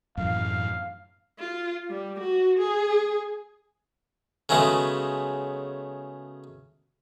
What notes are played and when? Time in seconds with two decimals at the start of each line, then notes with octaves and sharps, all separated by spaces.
0.17 F#2 A2 E3 F5
1.39 F4
1.90 G3
2.20 F#4
2.59 G#4
4.49 C#3 F#3 G#3 A3 B3